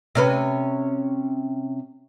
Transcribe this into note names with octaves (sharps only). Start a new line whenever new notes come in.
C3 C#4 B4